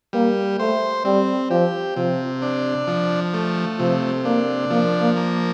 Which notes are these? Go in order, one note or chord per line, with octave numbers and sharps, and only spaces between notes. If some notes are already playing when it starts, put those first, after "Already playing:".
G3 A#3
A3 C5
G3 C4
F3 G4
C3 F3
D4
F3
A3
C3 F3
A#3 D4
F3 A#3
A#3
A#3